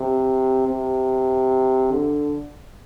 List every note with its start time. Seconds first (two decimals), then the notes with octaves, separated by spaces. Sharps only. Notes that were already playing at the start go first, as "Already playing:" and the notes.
Already playing: C3
0.68 C3
1.91 D3